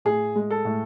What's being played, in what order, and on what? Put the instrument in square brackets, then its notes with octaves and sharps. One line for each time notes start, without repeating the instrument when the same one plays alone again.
[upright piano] A2 G#4
G#3
A4
A2